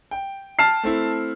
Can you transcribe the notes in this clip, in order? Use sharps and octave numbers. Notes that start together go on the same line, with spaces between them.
G5
A5 F6 C7
A3 C4 E4